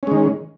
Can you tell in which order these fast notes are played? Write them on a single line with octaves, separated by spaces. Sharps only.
C#4 G#3 D#3